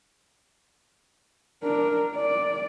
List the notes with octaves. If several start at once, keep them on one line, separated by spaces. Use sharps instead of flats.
D4 A#4
D5